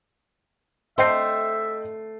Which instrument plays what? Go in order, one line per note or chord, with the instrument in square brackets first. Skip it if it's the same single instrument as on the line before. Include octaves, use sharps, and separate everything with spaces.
[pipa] D3 C4 C5 [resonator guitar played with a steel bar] A3 [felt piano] D#5 G5 C7 [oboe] E5